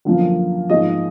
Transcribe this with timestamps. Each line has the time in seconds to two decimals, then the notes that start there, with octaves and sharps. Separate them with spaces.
0.05 F#2 D3 F3 A#3
0.70 G#2 F3 A#3 D#5